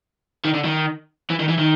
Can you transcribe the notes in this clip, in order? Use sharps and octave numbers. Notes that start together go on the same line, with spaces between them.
D#3
D3
D#3
E3
D#3
E3
D#3